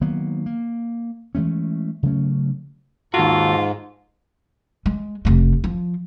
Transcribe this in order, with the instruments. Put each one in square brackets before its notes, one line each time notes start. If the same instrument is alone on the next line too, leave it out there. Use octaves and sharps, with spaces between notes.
[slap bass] D#3 F#3 A#3 B3
A#3
E3 G#3 A3 C#4
C#3 F#3 A3 C#4
[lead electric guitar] D#2 F#4 [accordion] G#2 [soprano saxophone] F4 [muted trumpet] A4
[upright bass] G#3
F1 A3
F3